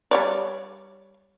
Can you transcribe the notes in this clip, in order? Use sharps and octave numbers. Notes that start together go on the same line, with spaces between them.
G3 C#5 D5